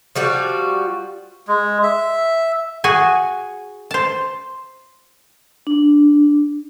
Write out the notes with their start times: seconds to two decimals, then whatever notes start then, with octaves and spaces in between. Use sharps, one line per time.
0.15 F3 G3 F#4
1.48 G#3
1.83 E5
2.84 F#4 G#4 G#5
3.91 C5 A5
5.67 D4